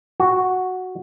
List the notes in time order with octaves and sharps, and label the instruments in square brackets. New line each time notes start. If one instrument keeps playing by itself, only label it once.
[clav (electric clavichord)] F#4